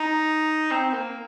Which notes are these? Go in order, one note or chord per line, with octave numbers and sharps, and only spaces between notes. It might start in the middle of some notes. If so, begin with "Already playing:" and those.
Already playing: D#4
C4
C4
A#3